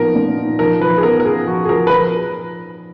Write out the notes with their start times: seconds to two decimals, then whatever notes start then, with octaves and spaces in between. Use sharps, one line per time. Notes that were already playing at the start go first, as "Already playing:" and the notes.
Already playing: A#2 F3 B3 D#4 A#4
0.15 A#2
0.38 D#4
0.59 F3 A#4
0.81 F3 B4
0.98 G#4
1.03 B3 A#4
1.20 A#4
1.25 F4 G#4
1.47 F3 F#4
1.66 G#4
1.69 F3 A#4
1.87 B4
1.91 F3 A#4